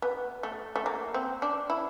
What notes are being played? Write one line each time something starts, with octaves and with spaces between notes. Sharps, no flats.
B3
A3
A3
A#3
C4
D4
E4